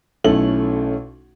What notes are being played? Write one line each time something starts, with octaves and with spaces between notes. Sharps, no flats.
B1 A3 C#4 E4 A4 F#7